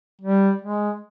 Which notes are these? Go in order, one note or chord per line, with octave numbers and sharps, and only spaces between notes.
G3
G#3